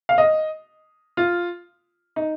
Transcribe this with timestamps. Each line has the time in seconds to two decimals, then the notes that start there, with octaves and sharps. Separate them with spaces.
0.09 F5
0.18 D#5
1.17 F4
2.16 D#4